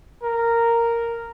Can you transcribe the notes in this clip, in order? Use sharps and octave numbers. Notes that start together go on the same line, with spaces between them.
A#4